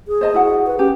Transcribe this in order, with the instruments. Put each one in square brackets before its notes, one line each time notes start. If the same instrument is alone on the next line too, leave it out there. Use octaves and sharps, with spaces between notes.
[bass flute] G#4
[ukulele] C5 D#5 A5
E4 F#4 F#5
[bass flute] B4
[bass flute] C#4 [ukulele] G4